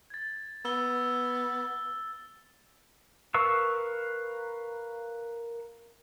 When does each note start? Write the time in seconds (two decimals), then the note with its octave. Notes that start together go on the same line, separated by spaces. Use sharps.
0.10 G#6 A6
0.65 B3 E6 G7
3.34 A#4 B4 F5 C#6 E6